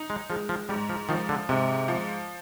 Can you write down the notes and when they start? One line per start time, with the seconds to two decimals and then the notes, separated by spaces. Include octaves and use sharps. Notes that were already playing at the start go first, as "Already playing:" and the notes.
Already playing: D#4
0.10 G#3
0.30 F3 G#3
0.49 F3
0.69 G#2 G3
0.89 F3
1.09 D#3 F3
1.29 D3
1.49 G#2 C3
1.88 F3